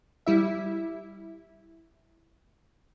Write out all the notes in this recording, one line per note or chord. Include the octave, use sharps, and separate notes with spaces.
G3 E4 E5